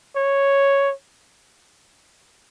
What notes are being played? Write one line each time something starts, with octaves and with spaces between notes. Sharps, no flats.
C#5